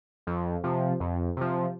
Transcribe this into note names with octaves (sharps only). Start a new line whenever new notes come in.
F2
C3 F3
F2
C3 F3